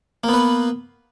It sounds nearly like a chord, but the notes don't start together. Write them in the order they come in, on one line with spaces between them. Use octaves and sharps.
A#3 B3 B4